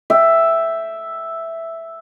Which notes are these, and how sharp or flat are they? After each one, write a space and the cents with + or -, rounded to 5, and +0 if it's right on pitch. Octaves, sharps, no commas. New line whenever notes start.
E5 +0 G5 +0